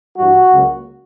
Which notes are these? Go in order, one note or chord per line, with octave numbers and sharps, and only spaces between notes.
G2 E3 G3 F#4
C#2 C#3 F#3 A#3